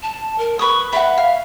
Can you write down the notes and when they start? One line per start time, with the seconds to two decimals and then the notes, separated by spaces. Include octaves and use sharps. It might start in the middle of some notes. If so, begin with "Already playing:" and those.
0.02 A5
0.38 A#4
0.59 B4 C#6 D#6
0.93 B4 E5 F#5
1.18 F5